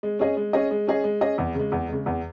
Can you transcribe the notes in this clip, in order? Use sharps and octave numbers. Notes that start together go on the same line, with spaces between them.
G#3
C#4 G#4 D#5
G#3
C#4 G#4 D#5
G#3
C#4 G#4 D#5
G#3
C#4 G#4 D#5
E2
C#3 G#3
E2
C#3 G#3
E2